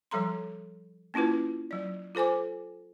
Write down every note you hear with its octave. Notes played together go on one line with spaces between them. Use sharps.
F3 G3 A4 A#5 C6
A#3 C#4 E4 F4 B4
F#3 D5
F4 A4 C5 G#5 D6